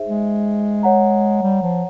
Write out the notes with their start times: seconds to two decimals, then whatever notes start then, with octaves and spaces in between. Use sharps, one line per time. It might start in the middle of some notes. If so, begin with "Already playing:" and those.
Already playing: D#4 G#4 C5 E5
0.09 G#3
0.83 C#5 F#5 A#5
1.43 G3
1.63 F3